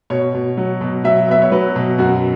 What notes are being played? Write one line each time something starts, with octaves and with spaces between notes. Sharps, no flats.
B2 C#5
B2
F#3
B2
F#3 E5
B3 E5
C#5
F#3 B4
B2
F#2 F#4